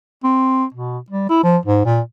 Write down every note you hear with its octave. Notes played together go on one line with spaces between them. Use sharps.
C4
B2
G3
E4
F3
G#2
A#2